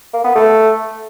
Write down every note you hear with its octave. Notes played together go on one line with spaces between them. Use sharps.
A#3
B3
A3